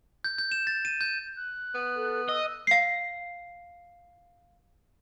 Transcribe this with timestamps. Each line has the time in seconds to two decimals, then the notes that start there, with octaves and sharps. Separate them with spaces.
0.24 G6
0.38 G6
0.52 E7
0.67 A6
0.85 D#7
1.01 G6
1.37 F#6
1.74 B3
1.96 A4
2.29 D#5 E6
2.67 F5 C7